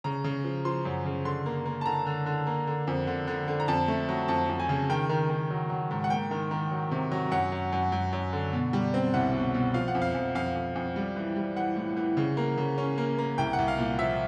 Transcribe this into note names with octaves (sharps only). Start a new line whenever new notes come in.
C#3 A#5
C#3
F3
F3 C6
F#2
C#3
D3 C6
A#3
A#3
A5
D3 A#5
D3
D3
A#3
D3
F2
D3
D3
D3
A#5
F2 A5
A3
F#3
F2 A5
F2
G#5
C#3
D#3 G5
D#3
D#3
F#3
F#3
G#2
F#5
A#3 G5
D#3
D#3
F#3
C3
F#3
F#2 F#5
F#2
F#2
F#2
F#2
D3
B2
G3
C4
C2 F#5
B2
B2
F3 F5
F#5
F2
F5
F2
F2 F5
F2
F2
G3
E3
G3
E3 F#5
A2
E3
C#3
A#3
C#3
C#4
A#3
A#3
C2 G5
F#5
C2
F5
A#2
F3 E5